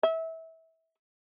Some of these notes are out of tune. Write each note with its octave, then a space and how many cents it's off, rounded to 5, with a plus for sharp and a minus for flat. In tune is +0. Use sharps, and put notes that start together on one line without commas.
E5 -25